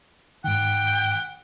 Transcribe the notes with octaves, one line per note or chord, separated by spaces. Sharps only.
G#2 D#3 F#5 G5